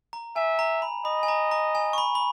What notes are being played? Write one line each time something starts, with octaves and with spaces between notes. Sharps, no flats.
A#5
E5 G#5
A#5
B5
D#5 B5
G#5
A#5
A#5
G#5
C#6
B5
B5